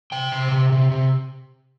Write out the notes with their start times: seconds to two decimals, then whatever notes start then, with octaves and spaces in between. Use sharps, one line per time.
0.12 C3 G5
0.32 C3
0.52 C3
0.72 C3
0.91 C3